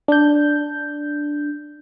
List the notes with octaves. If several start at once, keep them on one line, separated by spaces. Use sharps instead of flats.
D4 G6